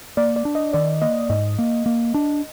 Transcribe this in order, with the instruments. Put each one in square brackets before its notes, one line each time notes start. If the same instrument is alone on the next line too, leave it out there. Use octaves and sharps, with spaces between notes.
[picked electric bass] A#3 [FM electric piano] D5
[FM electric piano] D5
[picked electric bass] D4
[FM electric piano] D#5
[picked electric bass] D#3 [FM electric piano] D5
[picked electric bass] A#3 [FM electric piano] D#5
[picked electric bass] G#2 [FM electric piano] D#5
[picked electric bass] A#3
A#3
D4